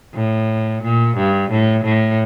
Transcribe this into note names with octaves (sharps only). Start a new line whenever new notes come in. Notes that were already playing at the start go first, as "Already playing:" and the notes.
A2
A#2
G2
A2
A2